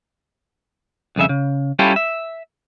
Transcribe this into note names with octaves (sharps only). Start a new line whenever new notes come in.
C2 F2 C#3 E5
C#3
G3 C#4 E4 F4 G4 A4
E5